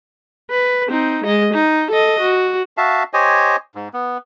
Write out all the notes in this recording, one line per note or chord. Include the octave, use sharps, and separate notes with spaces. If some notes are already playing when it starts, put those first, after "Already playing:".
B4
C4 D#4
G#3 D#5
D#4
A4 D#5
F#4
F#4 E5 F5 A5
G4 C5 C#5 D#5 G#5
G#2
B3